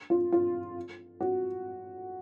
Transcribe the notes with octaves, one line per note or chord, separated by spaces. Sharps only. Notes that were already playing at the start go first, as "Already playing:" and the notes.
F4
F4
F#4